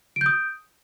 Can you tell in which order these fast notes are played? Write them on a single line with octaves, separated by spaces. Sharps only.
D7 G6 D#6